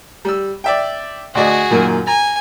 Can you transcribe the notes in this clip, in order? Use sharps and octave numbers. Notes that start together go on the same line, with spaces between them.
G3 E6
D5 E5 G5
D2 F#4 G#4 D5 D#5
F#2 A#2 D#3
G#5 A#5